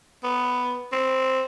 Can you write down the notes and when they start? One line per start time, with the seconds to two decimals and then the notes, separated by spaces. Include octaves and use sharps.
0.23 B3
0.92 C4